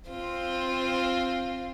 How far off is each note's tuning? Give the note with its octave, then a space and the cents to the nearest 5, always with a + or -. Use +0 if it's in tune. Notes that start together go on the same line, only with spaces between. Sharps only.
C4 +10 F4 +0